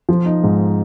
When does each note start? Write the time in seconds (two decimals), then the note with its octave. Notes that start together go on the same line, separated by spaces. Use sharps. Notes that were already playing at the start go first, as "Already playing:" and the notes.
0.09 F3
0.26 D#4
0.44 G#2